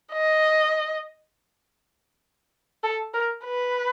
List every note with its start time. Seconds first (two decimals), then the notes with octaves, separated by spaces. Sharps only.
0.13 D#5
2.84 A4
3.14 A#4
3.44 B4